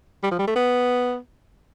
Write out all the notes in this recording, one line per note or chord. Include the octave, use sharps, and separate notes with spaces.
G3
F3
G3
A3
B3